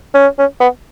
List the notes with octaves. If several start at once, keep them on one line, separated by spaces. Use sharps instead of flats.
C#4
C#4
B3